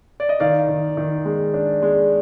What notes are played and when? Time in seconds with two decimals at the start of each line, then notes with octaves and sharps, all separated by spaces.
0.20 D5
0.29 D#5
0.40 D#3 D5 F5
0.69 D#3
0.97 D#3
1.25 G#3
1.54 D4
1.83 G#3